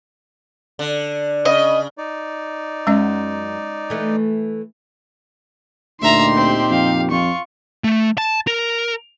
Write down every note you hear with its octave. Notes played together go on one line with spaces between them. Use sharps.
D3
C#3 D#5
D#4 D5
F#2 G#3 C#4 D#5
E3 A3
D2 A#2 D#4 G4 E5 A#5 C6
C4
F2 F5
F2 F4 C#6
A3
A5
A#4